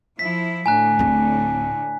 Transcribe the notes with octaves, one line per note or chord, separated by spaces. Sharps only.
F3 E4 B6
A2 D3 G#5 A#5 F#6
D1 C4